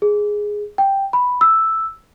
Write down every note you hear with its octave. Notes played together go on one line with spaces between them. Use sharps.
G#4
G5
B5
E6